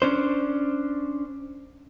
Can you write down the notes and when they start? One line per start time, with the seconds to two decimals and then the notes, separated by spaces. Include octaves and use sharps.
0.02 C#4 D4 C5